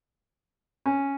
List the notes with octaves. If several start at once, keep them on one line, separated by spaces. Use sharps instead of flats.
C#4